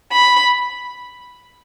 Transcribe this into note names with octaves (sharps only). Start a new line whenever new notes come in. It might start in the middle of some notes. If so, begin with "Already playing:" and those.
B5